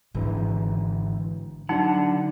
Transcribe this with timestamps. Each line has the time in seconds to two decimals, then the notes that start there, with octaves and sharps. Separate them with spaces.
0.15 G#1 G#2 D3 E3
1.69 D3 F#3 D4 D#4 F#5